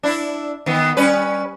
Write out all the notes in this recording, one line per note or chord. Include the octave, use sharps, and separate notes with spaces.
D4 E4
D#3 B3
G3 C#4 B4